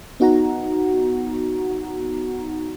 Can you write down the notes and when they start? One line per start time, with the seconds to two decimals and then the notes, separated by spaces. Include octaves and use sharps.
0.20 B3 D#4 F#4 F#5 A#5